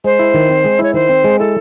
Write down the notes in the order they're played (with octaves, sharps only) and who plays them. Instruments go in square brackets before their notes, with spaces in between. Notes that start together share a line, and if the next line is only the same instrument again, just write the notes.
[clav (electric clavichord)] G#3 [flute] C5
[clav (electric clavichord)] E4
D#3
C4
G#3
[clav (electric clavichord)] E4 [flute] C#5
[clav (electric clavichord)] D#3 [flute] C5
[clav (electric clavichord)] C4
G#3
[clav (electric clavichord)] E4 [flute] A4